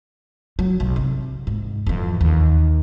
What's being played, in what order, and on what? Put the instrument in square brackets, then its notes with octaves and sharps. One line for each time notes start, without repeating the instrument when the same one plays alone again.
[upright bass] F#3
B1
C3
G#2
F2 E3
D#2